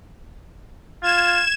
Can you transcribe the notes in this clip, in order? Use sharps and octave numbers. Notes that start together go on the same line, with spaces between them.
F4 G#6 E7